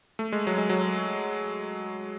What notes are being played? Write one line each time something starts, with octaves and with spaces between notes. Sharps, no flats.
A3
G#3
F#3
G#3
F#3